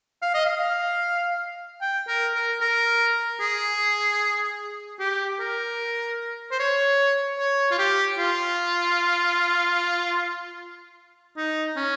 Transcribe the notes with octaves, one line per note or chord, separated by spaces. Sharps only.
F5
D#5
F5
G5
A#4
A#4
A#4
G#4
G4
A#4
C5
C#5
C#5
F4
G4
F4
D#4
C#4